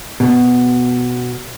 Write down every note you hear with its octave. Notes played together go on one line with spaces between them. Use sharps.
B2